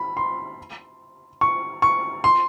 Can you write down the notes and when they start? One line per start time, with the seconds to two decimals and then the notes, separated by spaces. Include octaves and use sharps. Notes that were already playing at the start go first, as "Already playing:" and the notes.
Already playing: B5
0.17 C6
1.41 C#6
1.82 C#6
2.24 C6